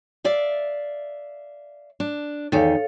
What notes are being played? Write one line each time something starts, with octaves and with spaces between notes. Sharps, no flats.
D5 E5 F5
D4
E2 D#3 A4 C#5 F5